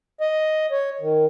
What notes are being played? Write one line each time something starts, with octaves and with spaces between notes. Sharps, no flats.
D#5
C#5
D#3